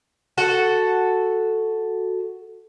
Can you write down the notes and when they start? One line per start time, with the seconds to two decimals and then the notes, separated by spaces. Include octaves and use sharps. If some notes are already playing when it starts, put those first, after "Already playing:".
0.38 F#4 A4 F#5